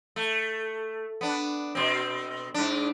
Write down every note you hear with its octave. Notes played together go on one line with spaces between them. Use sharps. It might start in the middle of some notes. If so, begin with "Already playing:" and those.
A3
B3 D4
B2 C4
G#2 D4